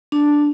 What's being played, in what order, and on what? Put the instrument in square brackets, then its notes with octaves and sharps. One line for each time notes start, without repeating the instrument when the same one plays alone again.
[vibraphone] D4